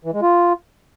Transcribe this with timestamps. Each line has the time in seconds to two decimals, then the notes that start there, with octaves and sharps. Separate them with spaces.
0.05 E3
0.13 G#3
0.22 F4